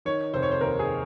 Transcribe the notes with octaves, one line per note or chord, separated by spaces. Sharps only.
D#3 C#5
F1 C5
C#5
C5
D#2 A#4
G#4